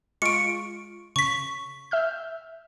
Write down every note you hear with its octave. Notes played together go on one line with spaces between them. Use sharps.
G#3 F4 C#6 C#7 D7
C#3 C#6 B6
E5 F6 G6